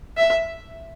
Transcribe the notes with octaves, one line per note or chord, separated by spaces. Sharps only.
E5